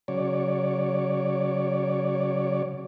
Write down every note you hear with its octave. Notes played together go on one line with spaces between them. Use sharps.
C#3 F#3 C#5 D5